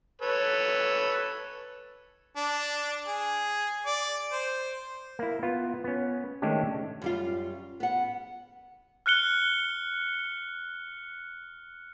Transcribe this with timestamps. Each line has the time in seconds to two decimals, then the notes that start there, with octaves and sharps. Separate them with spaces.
0.22 A4 B4 C#5
2.36 D4
3.06 G#4
3.86 D5
4.32 C5
5.19 A#3 E4
5.43 B3 F4
5.84 B3 C#4
6.42 D#3 G#3 A3 C#4 D4 G4
7.02 F#2 G3 F4
7.80 B3 F#5
9.06 F6 F#6 C#7 G7